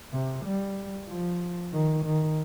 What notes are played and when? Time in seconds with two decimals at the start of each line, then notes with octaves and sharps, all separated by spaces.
0.12 C3
0.44 G3
1.09 F3
1.73 D#3
2.05 D#3